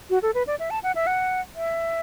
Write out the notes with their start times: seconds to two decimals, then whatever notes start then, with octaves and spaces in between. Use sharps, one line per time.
0.10 F#4
0.22 A4
0.35 B4
0.47 D5
0.59 E5
0.71 A5
0.83 F#5
0.95 E5
1.07 F#5
1.56 E5